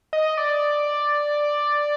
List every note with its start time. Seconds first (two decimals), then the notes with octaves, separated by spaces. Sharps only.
0.13 D#5
0.38 D5